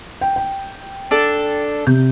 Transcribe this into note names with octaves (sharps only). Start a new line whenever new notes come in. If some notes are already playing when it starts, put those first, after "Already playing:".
G5
G5
D4 A4
C3 G6